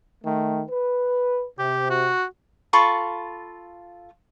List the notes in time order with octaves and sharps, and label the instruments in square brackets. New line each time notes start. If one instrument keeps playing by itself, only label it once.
[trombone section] D#3 A3
B4
[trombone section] C3 [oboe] G4
[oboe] F#4
[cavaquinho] F4 A4 B5 C#6